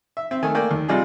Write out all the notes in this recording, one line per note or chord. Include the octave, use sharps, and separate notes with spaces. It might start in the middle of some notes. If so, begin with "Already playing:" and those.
E5
C4 E5
D#3 A3 G#5
A3 A#3 D5 G5 G#5
D#2
C3 G3 D#4 F4 G#4